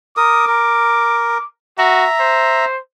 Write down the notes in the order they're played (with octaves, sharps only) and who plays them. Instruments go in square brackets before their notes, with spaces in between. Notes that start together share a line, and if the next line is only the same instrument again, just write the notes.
[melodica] A#4 D#6 [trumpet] D6
[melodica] A#4
[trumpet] F#4 [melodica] E5 A#5
[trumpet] C5